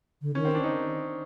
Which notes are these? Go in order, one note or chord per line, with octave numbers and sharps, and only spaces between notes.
D3
D#3 C#4
C4
D4
D#4